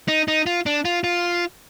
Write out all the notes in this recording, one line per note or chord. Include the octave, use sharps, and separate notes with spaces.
D#4
D#4
F4
D4
F4
F4